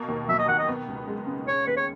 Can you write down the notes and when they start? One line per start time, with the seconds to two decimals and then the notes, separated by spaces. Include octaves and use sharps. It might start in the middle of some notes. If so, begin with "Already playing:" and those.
Already playing: B2 A#3
0.08 D#2
0.29 F#3 E5
0.38 D#5
0.48 D#3 F#5
0.59 D#5
0.68 B3
0.88 C#2
1.08 G#3
1.27 C#3
1.47 C#4 C#5
1.67 D#2 B4
1.76 C#5